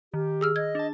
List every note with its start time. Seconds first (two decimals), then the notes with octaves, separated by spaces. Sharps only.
0.14 D#3 G4
0.41 G#4 E6 F6
0.56 D#5 G#6
0.75 D4 A5